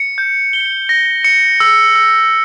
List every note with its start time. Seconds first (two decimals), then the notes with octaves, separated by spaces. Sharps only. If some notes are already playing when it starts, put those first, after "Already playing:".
Already playing: C#7
0.18 G6
0.53 G7
0.89 A#6
1.25 C#7
1.60 E6
1.96 E6